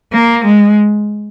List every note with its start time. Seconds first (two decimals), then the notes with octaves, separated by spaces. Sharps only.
0.13 A#3
0.45 G#3